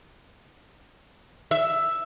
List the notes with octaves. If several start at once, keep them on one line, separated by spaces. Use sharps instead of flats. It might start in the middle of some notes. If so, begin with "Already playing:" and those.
E5